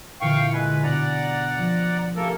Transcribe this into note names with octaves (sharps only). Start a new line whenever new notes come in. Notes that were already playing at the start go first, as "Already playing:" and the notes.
A#2 D3 E3 F5 G5 C#6
G#3 B4 G#5 C#6 E6
B2 D4 D5 F#5 A#5
F3
A3 A#3 C#4 G4 A4 A#4